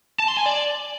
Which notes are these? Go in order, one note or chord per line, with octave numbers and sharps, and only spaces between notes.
A5
C6
G#5
D5